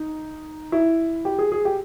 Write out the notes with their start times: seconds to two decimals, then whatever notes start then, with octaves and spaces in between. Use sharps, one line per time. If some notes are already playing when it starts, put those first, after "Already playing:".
Already playing: D#4
0.72 E4
1.25 G4
1.39 G#4
1.52 G#4
1.65 G4